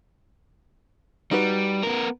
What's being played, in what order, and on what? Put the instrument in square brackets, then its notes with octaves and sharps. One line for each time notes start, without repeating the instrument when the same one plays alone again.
[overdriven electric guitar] G3 [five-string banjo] D#4 F#4 B4
[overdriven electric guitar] B3 A#4